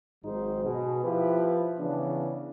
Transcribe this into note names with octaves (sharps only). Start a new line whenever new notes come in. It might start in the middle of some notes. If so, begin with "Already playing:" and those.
G#1 G#2 D#3 F#3 D#4 C5
B2 G#4
F3 E4 G4 B4
C#3 E3 B3 C#4 D4